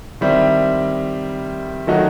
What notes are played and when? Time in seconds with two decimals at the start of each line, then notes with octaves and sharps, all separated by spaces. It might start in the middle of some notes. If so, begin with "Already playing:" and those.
0.21 D#3 G3 C4 E4
1.87 D#3 F#3 A3 D#4 F#4